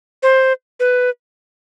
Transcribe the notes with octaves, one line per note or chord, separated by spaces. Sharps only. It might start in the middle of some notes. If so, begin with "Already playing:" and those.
C5
B4